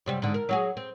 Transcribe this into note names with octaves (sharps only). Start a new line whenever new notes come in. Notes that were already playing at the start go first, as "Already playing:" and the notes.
F#2 C3 G3
G#2 D3
A#4
F#3 F#4 G#4
C4